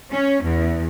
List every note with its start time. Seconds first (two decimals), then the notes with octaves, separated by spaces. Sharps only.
0.11 C#4
0.44 E2